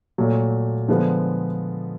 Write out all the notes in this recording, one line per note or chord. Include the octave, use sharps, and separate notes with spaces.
A#2 F#3 A3
D3 F3 G#3 B3